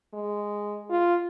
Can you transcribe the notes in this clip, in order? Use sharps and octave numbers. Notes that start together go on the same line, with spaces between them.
G#3
F4